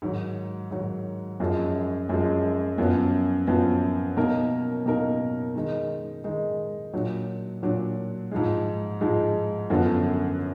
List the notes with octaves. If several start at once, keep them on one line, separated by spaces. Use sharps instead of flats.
G#2 D#3 F#3
G#2 D#3 F#3
F#2 F3 G#3
F#2 F3 G#3
F#2 F3 B3
F#2 F3 B3
B2 A#3 D#4 A#4
B2 A#3 D#4 A#4
D#3 G#3 D#4
D#3 G#3 D#4
A#2 F#3 D4
A#2 F#3 D4
G#2 F3 G#3
G#2 F3 G#3
F#2 D3 F3 B3